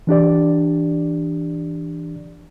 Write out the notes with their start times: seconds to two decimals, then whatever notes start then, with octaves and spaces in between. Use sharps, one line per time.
0.07 E3 D4 G4 D5